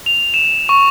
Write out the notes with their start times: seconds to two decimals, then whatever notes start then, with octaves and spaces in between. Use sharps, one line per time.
0.06 F7
0.34 E7
0.69 C#6